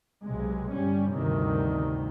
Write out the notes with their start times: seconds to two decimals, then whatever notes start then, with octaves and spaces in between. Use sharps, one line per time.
0.23 B1 C3 G#3
0.73 G1 G3 C#4
1.13 G1 D2 C3 D#3